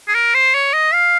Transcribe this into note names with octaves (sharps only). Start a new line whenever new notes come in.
G#4
A#4
C5
C#5
D#5
F5